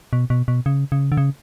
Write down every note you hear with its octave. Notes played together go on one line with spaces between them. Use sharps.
B2
B2
B2
C#3
C#3
D3
C#3